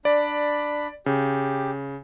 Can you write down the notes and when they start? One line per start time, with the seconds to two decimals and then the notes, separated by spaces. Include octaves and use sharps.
0.05 D4 D5 B5
1.06 C#3 G4